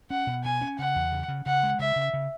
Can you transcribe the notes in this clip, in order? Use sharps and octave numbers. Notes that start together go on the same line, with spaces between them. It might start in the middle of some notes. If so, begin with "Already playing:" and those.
C#4 F#5
B2
B2 G#5
C#4
C#3 F#5
E2
C#3
C#3
C#3 F#5
G#3
C#3 E5
C#3
C#3